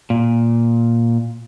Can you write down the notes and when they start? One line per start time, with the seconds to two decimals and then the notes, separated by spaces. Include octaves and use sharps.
0.10 A#2